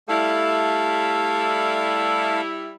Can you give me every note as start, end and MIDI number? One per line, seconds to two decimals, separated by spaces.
0.09 2.73 55
0.09 2.41 57
0.09 2.73 64
0.09 2.41 69
0.09 2.41 77